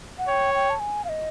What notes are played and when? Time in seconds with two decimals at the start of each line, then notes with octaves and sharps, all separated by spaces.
0.18 F#5
0.28 C#5 G5
0.54 G5
0.70 A5
0.80 G#5
1.05 F5
1.09 D#5